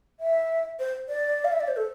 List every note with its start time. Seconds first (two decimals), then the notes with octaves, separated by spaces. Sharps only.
0.20 E5
0.79 C5
1.09 D5
1.45 F5
1.52 E5
1.60 D5
1.68 C5
1.77 A4